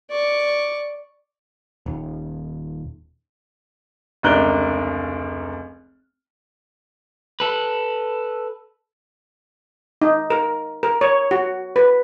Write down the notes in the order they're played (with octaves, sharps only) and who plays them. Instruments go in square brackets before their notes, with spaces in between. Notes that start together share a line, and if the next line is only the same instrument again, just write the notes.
[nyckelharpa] D5 C#6
[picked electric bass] D#1
[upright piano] F1 C#2 D4 A#4 F#6 G7
[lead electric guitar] A4 B4
[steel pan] D#4
A#4
A#4
C#5
F#4
B4